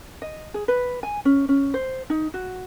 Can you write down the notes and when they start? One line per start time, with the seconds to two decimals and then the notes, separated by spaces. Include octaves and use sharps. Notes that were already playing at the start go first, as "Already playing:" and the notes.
0.22 D#5
0.54 G#4
0.68 B4
1.03 G#5
1.25 C#4
1.49 C#4
1.74 C5
2.10 D#4
2.34 F#4